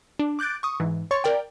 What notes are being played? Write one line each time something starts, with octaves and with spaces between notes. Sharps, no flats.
D4
D6 F#6 G6 A6 D7
C#6 D#6
G#2 E3
C#5 C6 C#6 A6
A#4 D5 G5